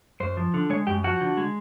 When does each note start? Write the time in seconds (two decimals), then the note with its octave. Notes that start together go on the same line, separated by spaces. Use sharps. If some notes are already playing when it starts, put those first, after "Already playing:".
0.20 F#2 C5
0.37 F3
0.54 D3
0.70 G#3 C#5
0.87 F#2 G4
1.04 F3 F#4
1.21 D3
1.37 G#3